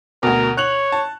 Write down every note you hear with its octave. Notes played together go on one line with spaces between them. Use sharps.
D2 B2 A#4
C#5 F#6 F7 F#7
A5